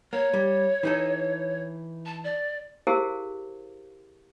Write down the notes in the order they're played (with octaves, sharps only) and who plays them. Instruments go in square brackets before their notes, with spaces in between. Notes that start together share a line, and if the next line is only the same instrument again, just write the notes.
[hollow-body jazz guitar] A#3 [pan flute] C#5
[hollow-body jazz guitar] G3
E3 D#4 A4
[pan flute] A5
D5
[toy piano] E4 G4 G#4 A#4 C5 F5